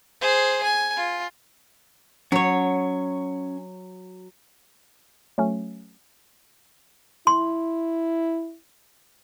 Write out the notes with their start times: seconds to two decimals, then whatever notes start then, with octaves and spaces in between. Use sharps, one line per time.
0.21 G#4 C5
0.63 G#5
0.97 F4
2.32 F#3 C#4 C#5 C#6
5.38 F#3 A3 C#4
7.27 E4 C6